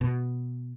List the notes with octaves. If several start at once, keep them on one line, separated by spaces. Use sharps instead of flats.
B2